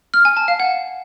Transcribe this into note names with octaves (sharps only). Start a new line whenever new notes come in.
F6
G#5
A5
F5
F#5